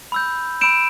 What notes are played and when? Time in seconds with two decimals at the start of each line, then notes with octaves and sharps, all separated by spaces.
0.12 B5 E6 G6
0.61 B5 E6 G6 D7 E7